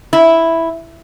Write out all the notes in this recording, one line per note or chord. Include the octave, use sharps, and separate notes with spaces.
E4